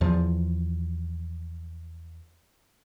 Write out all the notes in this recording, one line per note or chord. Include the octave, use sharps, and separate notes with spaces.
E2 F3